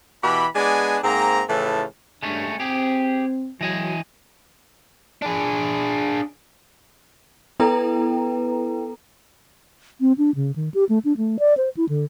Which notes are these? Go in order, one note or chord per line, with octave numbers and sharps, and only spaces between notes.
B2 E3 G4 B5
G#3 B3 D4 D5 G#5
G#2 A#3 C4 A#5
A2 C#3 E3 F3 A5
G2 G#3 A3 C#4 D4
C4 G4 G#4
E3 F#3 D#5 G#5
D4 G#4
B3 E4 A4 B4 G5 A#5
C4
D4
C#3
D#3
G4
A3
D4
A3
D5
C5
E4
D3